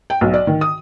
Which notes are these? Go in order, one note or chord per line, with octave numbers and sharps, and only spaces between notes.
G5
B1
D5
D#3
D#6